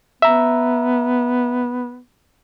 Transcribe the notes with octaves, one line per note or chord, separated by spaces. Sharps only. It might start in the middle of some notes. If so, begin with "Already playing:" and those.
B3 E5 A#5